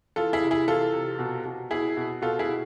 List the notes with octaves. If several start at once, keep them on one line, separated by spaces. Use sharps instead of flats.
E3 F4 A4
E4 G#4
C3
E4 G#4
E3 F4 A4
C3
B2
B2
B2 E4 G#4
B2
B2 F4 A4
E4 G#4
B2